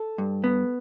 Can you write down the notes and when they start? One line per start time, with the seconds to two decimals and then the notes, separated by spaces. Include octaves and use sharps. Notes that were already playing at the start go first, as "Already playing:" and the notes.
Already playing: A4
0.18 G2
0.44 B3